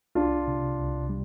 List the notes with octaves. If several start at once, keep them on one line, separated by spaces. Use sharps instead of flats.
C2 D4 F4
C3
C2
G3